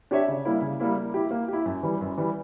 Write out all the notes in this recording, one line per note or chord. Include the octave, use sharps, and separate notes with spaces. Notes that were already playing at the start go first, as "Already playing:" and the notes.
D4 G4 C#5 E5
C#3
G3 A#3 E4
C#3
G3 A#3 E4
A#3
E4 G4
A#3
E4 G4
F#2
E3 G3
F#2
E3 G3